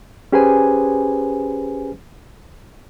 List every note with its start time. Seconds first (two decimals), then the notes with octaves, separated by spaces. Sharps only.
0.32 C#4 G4 G#4 B4 C5 G#5